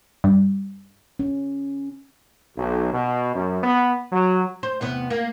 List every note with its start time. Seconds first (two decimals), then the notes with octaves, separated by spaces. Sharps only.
0.24 G2
1.19 C#4
2.57 B1
2.93 B2
3.35 F#2
3.64 B3
4.11 F#3
4.63 C5
4.81 E2 C3 B3
5.10 A#3